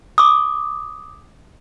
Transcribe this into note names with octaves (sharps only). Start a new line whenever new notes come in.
D6 D#6